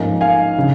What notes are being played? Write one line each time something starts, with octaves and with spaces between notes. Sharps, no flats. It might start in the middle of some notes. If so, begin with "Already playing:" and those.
Already playing: G#2 F3 A#3 C#4
F5 G#5
C#3